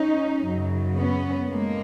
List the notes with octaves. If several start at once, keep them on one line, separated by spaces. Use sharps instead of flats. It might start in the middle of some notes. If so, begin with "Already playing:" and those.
Already playing: C#4 D#4
F#2 C#3 F#3
B3 C#4
A2 G#3 A#3